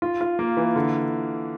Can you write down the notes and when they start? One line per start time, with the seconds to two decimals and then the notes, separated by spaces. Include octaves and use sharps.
0.02 F4
0.21 F4
0.39 A#3
0.57 E3
0.76 D3